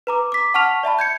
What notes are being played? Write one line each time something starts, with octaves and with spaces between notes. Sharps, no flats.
B4 A#5 D6
D6 B6
F#5 A5 C#6 F6 B6 F7
D5 E5 A5 B5
G6 G#6 C#7